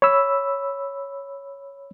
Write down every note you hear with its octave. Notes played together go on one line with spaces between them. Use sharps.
C#5 B5 E6